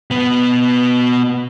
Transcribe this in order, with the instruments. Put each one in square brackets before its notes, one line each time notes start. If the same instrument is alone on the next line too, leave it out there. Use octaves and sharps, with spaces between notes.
[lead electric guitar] B2 B3